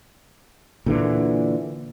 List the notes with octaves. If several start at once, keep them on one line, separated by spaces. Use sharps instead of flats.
A#2 D3 E3